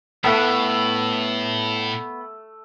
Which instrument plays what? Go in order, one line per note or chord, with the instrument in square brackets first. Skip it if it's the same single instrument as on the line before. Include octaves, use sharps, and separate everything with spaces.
[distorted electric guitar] A2 [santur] A3 [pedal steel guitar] B3 F#5 F#6